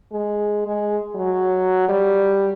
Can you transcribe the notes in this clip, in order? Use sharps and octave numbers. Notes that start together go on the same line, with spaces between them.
G#3
G#3
F#3
G3